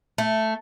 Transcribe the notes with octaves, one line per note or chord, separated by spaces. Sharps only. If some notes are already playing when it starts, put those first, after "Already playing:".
A3